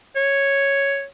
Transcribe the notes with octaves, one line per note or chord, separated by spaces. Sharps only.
C#5